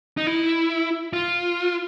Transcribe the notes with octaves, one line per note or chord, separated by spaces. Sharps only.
D#4
E4
F4